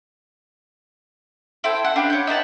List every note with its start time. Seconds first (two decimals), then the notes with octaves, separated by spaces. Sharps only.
1.64 E4 A4 C5 G5
1.85 F#5
1.96 D4 G4 B4 F5
2.10 C#5 G6
2.27 D#4 E4 B4 A5